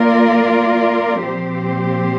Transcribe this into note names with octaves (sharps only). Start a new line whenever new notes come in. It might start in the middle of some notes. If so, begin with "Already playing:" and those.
Already playing: A#3 F4 A#4 D5
A#2 F3 C4 G4 C5